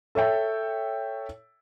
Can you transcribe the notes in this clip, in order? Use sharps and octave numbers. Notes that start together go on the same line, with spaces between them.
A4 C#5 E5 G5